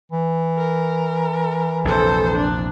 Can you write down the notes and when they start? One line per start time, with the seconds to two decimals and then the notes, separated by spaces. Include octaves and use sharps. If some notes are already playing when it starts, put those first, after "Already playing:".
0.11 E3
0.58 A#4
1.85 A#1 E2 C3 A4 C5
2.36 D4